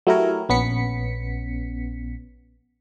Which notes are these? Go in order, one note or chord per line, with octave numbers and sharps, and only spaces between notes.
F#3 A3 E4 G4 A#4 C#5
A#1 B3 C#4 B6 C#7